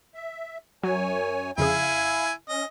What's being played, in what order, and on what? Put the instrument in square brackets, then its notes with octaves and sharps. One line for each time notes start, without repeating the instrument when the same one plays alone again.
[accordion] E5
[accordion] F#2 C#5 G#5 [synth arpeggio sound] F#3
[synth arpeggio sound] F2 C#3 G#4 [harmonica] E4 G#5 [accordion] F5
[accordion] C#4 [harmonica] D#5